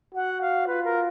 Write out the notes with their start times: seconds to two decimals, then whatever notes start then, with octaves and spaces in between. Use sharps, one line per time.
0.14 F#4 F#5
0.41 F5
0.67 F4 B4
0.84 A#4